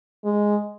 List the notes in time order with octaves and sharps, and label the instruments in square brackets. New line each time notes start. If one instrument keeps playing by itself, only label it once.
[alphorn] G#3